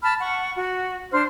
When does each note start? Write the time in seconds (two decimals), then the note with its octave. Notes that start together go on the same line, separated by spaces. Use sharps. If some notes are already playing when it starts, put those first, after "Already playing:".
0.03 A5 B5 F6
0.19 F#5 C#6
0.56 F#4
1.11 D4 C5 F6